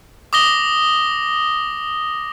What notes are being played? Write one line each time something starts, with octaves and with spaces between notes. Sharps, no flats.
D6 D#6 A#6 G7